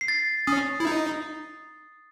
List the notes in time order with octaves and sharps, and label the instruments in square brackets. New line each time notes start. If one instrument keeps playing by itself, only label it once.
[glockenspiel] C7
A6
[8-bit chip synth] C#4 [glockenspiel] D#6
[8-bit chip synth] E4
D#4